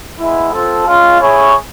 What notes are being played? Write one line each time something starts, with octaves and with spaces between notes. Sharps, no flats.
G#3 B3 E4
C4 F4 A4
G#3 C#4 F4
E4 G#4 C#5